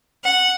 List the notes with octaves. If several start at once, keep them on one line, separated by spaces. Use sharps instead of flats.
F#5